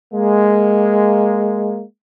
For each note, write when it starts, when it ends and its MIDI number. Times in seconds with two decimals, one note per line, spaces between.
0.14 1.82 56
0.14 1.82 58